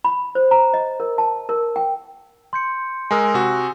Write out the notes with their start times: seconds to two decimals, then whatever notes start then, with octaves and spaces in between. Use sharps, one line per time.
0.04 B5
0.35 C5
0.51 A#5
0.74 D#5
1.00 A#4
1.18 A5
1.49 A#4
1.76 G5
2.53 C6 G6 C#7
3.11 G#3 A#4 G#5 D#6 E6
3.34 C3 F#4